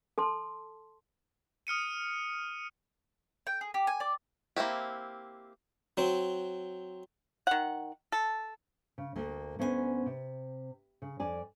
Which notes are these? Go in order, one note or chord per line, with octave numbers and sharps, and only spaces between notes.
A4 A5 C6
D#6 F6 C#7 D#7
G5
G#4
G4
G#5
D5
A#3 C4 E4 G4
F#3 C4
D#3 F#5
A4
C#3
D2 A#3
D2 B3 C#4 C5 C#5 G#5
C3
C#3
F2 D5 G#5